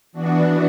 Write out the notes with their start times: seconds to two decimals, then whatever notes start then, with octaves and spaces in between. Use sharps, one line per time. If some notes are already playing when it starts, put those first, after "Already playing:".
0.12 E3 B3 D4 F#4